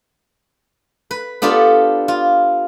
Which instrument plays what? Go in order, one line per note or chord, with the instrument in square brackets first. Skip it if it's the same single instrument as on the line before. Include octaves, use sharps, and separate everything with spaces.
[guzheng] B4
B3 D4 F4 G4 A4
F4